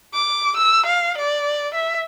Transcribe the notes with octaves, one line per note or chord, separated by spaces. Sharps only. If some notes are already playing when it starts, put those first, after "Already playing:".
D6
E6
F5
D5
E5